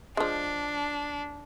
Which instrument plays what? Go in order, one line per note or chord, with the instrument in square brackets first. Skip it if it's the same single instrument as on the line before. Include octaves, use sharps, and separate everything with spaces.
[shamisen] F3 G#3 [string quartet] D4